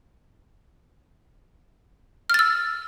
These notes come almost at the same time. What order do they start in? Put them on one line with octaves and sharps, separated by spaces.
F6 A6 E6